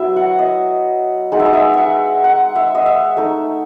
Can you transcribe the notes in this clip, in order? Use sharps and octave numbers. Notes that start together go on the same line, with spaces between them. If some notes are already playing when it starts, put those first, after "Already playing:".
Already playing: F#3 B3 E4 E5
F#5
D#5
G#3 D#4 F#5
E5
D#5
E5
E5 F#5
F#5
E5
D#5
E5
A3 D#4